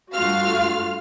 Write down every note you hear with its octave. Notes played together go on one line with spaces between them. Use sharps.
G2 A3 F4 F#4 F5 F6